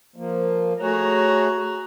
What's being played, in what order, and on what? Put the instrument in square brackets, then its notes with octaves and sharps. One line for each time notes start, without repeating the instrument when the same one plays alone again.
[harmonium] F3 A#3
[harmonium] A3 G#4 C#5 [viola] F#4 A#5